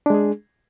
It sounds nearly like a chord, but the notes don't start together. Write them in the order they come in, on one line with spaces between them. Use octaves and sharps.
D4 G#3 G#4